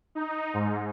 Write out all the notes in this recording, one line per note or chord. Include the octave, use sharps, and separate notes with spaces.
D#4
G#2